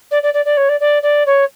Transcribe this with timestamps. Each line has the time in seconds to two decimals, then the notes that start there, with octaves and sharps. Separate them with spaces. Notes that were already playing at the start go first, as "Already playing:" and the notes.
0.11 D5
0.22 D5
0.33 D5
0.45 D5
0.57 C#5
0.68 D5
0.80 D5
1.02 D5
1.26 C#5